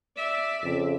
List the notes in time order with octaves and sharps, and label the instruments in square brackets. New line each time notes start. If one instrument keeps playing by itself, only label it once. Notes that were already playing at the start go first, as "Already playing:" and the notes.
[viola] D5 E5
[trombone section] F2 C#3